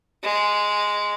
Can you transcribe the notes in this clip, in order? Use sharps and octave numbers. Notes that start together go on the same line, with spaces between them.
G#3